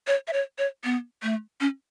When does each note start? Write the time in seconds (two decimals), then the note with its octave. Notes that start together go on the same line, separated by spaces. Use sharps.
0.07 C#5
0.27 E5
0.33 C#5
0.58 C#5
0.84 B3
1.23 A3
1.60 C#4